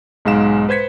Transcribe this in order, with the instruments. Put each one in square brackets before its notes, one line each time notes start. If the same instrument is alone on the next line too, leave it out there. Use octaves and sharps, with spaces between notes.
[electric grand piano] B1 G#2 G#3 F5 E7
B4 C5 G#6 B6 C#7